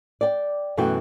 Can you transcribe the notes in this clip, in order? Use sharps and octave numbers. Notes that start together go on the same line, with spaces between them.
D5 G5
F#2 B2 E3 A3 F#4 G5